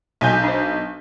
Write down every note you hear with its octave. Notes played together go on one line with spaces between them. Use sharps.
B1 G#5 G6
D4 C5